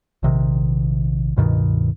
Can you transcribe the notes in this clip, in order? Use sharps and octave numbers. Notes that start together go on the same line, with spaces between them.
A#1 C3 D#3
C#2 G2 B2 D#3